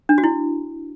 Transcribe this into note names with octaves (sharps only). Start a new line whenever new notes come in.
D4
F#4
E4